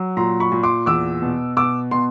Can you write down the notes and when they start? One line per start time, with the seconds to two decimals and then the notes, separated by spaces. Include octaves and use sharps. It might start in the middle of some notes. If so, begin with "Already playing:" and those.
Already playing: F#3
0.17 A#2 A#5 C6
0.40 B5 C#6
0.52 A#2
0.63 C6 D6
0.86 E2 D6 E6
1.22 B2
1.57 B2 D6 E6
1.91 B2 C6